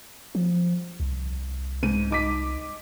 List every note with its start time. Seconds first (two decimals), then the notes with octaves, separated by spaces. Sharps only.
0.35 F3
1.00 C2
1.83 G#2 D#7
2.11 D#4 D6 B6